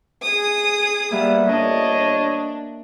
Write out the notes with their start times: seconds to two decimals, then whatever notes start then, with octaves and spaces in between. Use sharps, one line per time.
0.22 G#4 D#6
1.11 G3 A#3 B3 E5 F5
1.46 G1 D4 C#5 D#5